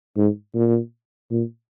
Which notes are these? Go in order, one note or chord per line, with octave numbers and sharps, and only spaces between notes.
G#2
A#2
A#2